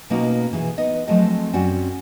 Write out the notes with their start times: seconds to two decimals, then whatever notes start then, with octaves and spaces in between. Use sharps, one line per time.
0.10 B2 A#3 C#4 D#4 F#4
0.52 B2 E3 G#4
0.78 B3 D#4 D#5
1.08 F3 F#3 G#3 A3 C4 D#5
1.53 F#2 C4 C#4 F#4 D5 F#5